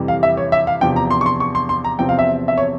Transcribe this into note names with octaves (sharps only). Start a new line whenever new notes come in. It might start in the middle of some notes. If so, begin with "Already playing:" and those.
Already playing: F2 C3 E3 G3
F5
E5
C#5
E5
F5
E2 C3 F3 G5
A#5
C6
C#6
C6
C#6
C6
C6
A#5
E2 C3 F3 C4 G5
F5
E5
E5
C#5